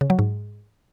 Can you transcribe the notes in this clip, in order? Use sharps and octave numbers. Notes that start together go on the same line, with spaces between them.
C#3
F#3
G#2